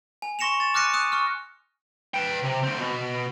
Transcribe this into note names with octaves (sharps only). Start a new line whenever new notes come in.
G#5
C6 C#6 A#6 C#7 E7 F7
A6 E7
D6 F6 F#6 A#6 C#7 D#7
D#6 F#6 D#7
C#6 F6
B4 G5
C3
D2 C4
B2